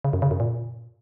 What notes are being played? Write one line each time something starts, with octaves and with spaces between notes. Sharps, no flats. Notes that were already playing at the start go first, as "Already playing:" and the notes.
C#3
F#2
C#3
F#2
A#2